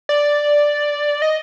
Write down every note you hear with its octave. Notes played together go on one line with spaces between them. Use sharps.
D5
D#5